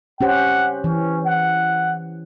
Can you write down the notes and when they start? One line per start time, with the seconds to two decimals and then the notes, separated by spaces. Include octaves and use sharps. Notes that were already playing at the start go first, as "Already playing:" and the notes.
0.21 C#4 G4 C5 F#5
0.84 E3 C#4
1.25 F#5